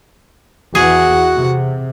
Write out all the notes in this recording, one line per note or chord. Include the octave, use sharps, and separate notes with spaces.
E2 E3 F#4 G#4 F#5
C3